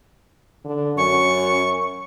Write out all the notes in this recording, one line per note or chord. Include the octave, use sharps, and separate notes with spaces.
D3
F#2 C#6